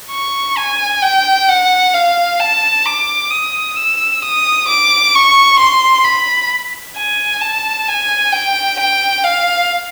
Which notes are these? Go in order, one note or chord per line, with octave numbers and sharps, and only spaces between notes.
C#6
G#5
G5
F#5
F5
A5
D6
D#6
E6
D#6
D6
C#6
C6
B5
G#5
A5
G#5
G5
G5
F5